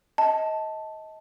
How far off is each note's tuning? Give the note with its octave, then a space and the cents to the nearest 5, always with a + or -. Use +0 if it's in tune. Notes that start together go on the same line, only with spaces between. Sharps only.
D#5 +25 A5 +0